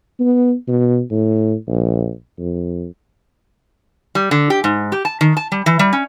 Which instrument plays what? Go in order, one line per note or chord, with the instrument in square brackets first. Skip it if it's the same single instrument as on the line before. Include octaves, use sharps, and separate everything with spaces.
[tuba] B3
B2
A2
A#1
F2
[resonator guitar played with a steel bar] G3
D3
G4
G#2
G4
A5
D#3
A5
G3
E3
G3
C#4